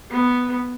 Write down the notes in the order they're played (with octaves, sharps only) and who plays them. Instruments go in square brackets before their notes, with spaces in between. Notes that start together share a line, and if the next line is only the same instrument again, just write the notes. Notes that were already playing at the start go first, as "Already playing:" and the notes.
[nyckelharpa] B3